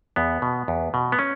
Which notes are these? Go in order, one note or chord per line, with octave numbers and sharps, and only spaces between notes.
E2 B3
B2
E2
B2
B3
C#4